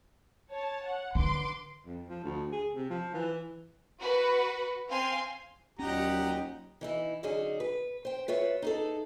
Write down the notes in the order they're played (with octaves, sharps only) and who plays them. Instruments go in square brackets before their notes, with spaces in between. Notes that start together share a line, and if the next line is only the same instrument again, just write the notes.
[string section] C#5 A5
F#5
[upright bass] D3 [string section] B4 C6 D6
[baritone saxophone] F2
F3
D2
G#4
C3
F3
E3
[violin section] F#4 B4
C4 F5 G#5 C6
[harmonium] D#2 A#2 D#4 [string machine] F#3 [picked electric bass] C#4 [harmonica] G4 F#5 A#5
[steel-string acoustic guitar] E3 D#4 E4
D3 F#3 C#4 D#4 G#4
B4
C5 G5
F4 B4 C#5 E5
D#4 G#4 A4